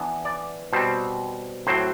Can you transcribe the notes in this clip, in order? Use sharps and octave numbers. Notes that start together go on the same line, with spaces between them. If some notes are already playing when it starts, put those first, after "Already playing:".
Already playing: E3 B3 D4
D5
B2 G3 C4 C5
A2 F#3 C4 C5